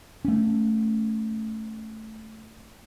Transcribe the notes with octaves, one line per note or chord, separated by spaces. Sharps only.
A3 C#4